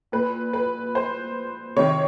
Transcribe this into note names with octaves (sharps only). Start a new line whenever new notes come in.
A#2 B4
B4
C5
C3 D#3 C#5